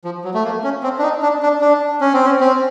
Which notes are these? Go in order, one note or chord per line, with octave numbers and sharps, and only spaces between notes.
F3
F#3
A3
A#3
C#4
C4
D4
D#4
D4
D4
D4
C#4
C4
C#4
C4